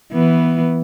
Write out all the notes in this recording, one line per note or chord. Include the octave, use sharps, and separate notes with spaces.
E3 B3